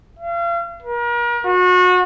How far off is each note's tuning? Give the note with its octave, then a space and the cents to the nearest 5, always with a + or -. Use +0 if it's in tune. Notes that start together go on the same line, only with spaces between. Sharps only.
F5 -40
A#4 +40
F#4 -30